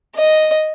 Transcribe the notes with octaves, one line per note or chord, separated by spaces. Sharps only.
D#5